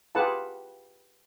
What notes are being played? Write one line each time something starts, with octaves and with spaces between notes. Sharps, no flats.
F4 G4 G#4 B4 F#5 A5